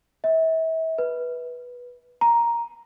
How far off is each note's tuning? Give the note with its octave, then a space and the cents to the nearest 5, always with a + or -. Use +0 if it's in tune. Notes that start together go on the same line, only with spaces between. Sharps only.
E5 -35
B4 -10
A#5 +5